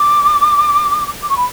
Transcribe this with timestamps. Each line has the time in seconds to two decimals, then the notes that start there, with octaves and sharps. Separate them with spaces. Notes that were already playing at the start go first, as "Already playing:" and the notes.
Already playing: D6
1.22 D6
1.29 C#6
1.37 B5